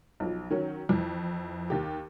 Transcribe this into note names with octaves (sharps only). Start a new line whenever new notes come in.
B1 F3
D#3 F#3 C#4
F2 E3
D#2 G4